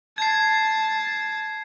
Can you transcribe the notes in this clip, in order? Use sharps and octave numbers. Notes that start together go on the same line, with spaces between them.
A5 G#6 C7